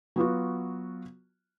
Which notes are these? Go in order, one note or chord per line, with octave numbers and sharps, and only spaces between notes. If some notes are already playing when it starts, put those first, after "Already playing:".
F#3 B3 F4 F#4